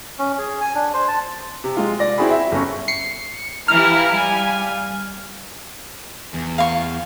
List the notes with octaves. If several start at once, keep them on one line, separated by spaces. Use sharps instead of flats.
C#4
G#4
G#5
D4
C5
A5
C3
G#3 F4
D5 A#6
C4 E4 F#4 G#4 B5
E5
G1 C#4 C#6
C7 C#7
E3 E4 G4 F5 A#5 F6
G3 G#5
E2
F5 C#6